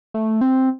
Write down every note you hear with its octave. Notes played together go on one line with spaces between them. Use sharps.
A3
C4